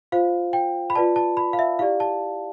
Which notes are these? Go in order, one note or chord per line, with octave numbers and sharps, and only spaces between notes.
F4 C5 F5
G5
B5
F4 B4 D5 A5
A5
B5
F5
E5
E4 G4 D5 F5
A5